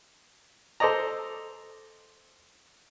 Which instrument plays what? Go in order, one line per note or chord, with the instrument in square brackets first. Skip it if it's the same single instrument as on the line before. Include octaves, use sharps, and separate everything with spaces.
[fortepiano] A4 C5 D5 D#5 A#5